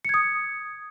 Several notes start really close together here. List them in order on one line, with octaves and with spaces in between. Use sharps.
C#7 G#6 D#6